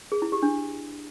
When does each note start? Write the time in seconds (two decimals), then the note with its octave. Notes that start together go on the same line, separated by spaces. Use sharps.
0.12 G#4
0.22 E4
0.32 G4
0.42 D4